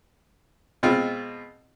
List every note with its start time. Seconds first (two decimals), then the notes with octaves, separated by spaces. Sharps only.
0.83 B2 G#3 C4 F4